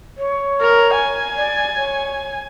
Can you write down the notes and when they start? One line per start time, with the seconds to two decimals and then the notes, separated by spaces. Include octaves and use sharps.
0.18 C#5
0.61 A#4
0.94 G#5
1.36 D5
1.76 C#5